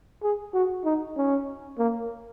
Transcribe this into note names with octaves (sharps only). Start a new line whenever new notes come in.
G#4
F#4
D#4
C#4
A#3